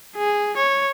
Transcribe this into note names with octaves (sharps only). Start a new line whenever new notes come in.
G#4
C#5